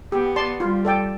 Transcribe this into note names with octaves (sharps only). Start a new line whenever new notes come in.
B3 G4
D5 A5 C6
G3 F4
A4 D5 G5